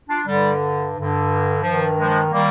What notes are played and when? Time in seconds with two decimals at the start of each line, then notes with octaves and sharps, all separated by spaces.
0.09 D4 F4
0.26 G2 D3 G3
0.95 G2 D3
1.63 G2 D#3 F3
1.97 F3 G#3
2.31 D#3 G3 A#3